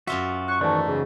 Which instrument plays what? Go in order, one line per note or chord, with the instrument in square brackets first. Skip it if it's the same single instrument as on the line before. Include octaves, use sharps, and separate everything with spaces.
[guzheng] F#2 F4 E5 [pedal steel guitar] F#4
[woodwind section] C#6 [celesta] F#6
[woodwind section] G#2 E3 A3 [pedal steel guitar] D#3 C#6 F#6 [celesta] D5 A5
[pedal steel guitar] C#3 [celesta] G#4